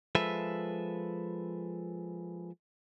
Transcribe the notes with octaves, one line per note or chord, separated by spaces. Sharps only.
F3 G#3 A4 B4 E5